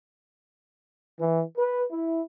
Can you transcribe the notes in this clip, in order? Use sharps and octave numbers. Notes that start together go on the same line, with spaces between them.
E3
B4
E4